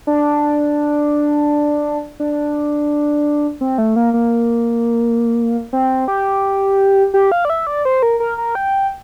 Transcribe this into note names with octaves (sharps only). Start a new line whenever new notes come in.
D4
D4
C4
A3
A#3
A#3
C4
G4
G4
F5
D5
E5
D5
C5
A#4
A#4
A#4
G5